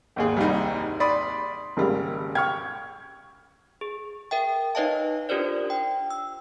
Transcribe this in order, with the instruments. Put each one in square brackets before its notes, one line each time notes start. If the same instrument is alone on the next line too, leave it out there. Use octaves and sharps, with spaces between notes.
[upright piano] G#1 D#2 G#4
[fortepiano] C2 [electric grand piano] G3 D#4
[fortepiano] D5 [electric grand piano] B5 C6 D#6
[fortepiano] G#1 C#3 [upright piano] G3 A#3
[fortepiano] G5 [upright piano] C#6 F6 G#6
[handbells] G#4
A#4 E5 G5
D#4 B4 C#5 D#5 F5 A5
D4 F4 G4 A#4 C5 D5
G5
E6